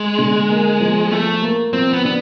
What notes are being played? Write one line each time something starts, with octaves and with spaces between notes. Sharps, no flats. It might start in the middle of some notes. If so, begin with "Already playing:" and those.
Already playing: G#3
D3
A#3
F3
F3 A3
A#3
F3 C4
B3
B3 D4